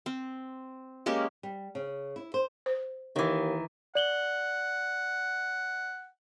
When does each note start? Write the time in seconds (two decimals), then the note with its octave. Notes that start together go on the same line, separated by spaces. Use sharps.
0.06 C4
1.06 G#3 A#3 C#4 G4
1.43 G3
1.75 C#3
2.16 E4
2.34 C5
2.66 C5
3.16 D#2 D#3 E3
3.95 D5 F#5 F#7 G7